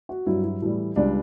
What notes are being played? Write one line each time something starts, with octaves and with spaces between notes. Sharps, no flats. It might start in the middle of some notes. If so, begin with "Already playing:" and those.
F#4
G2 F#3 E4
E4
A2 E3 G3
C#2 C#3 G3 D4